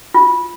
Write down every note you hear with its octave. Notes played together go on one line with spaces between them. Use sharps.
F4